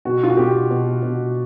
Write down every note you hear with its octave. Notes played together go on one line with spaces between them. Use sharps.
B2 F#4
F4
F#4
B2 G4
B2
B2